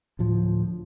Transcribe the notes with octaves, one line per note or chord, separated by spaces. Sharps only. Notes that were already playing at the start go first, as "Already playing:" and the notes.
D2 A2 F3